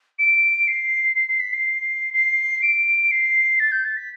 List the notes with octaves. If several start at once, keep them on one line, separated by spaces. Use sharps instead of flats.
D7
C7
C7
C7
B6
C7
C7
D7
C7
A6
G6
A6
B6